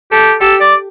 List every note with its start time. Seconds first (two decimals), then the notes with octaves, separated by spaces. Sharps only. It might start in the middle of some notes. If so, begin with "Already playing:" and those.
0.12 G4 A4
0.41 G4 A4
0.61 D5